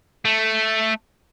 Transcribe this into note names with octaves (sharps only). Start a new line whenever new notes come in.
A3